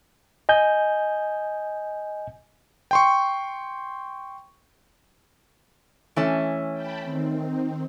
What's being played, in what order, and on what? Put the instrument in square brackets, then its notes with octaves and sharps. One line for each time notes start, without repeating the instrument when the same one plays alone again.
[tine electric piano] D#5 G#5 G6
[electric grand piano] G5 C6 C#6
[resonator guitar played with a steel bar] E3 A3 C#4
[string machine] G5 A5 B5
D#3 C4